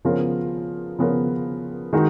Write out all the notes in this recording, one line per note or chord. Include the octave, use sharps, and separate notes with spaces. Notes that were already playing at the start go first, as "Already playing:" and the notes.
C#3 F3 B3 F4 A#4
C#3 F3 B3 F4 A#4
D#3 G#3 D#4 F#4